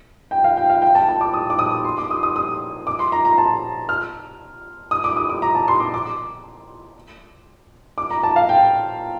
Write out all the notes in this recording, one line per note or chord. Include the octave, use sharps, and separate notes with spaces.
G5
F5
G5
F5
G5
A5
A5
D6
D#6
D6
D#6
C6
D6
D#6
D#6
D#6
D6
C6
A#5
A#5
A5
F6
D#6
D6
D#6
D6
A#5
A5
C6
D6
D6
D6
A#5
A5
F5
G5